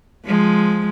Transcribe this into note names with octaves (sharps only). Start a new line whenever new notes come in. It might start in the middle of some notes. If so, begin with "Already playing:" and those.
F3 G#3